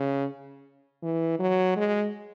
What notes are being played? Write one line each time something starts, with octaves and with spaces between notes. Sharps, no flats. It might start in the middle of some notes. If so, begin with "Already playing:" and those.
Already playing: C#3
E3
F#3
G#3